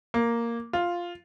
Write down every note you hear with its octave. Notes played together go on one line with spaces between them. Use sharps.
A#3
F4